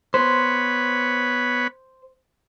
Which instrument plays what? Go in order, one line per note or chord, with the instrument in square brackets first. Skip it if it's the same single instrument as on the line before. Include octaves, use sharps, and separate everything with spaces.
[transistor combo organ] B3 C#5 B5 [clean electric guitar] C5